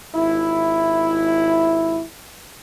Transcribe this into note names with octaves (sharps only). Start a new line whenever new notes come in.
G#1 E4